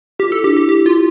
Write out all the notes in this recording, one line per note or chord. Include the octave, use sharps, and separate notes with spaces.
F4 G4
E4 A4
D4 G4
E4 G4
G4
F4